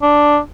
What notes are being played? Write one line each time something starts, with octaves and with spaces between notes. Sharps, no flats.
D4